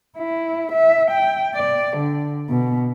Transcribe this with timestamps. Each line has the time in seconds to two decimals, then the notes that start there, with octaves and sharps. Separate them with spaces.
0.18 E4
0.72 E5
1.11 G5
1.55 D5
1.97 D3
2.49 B2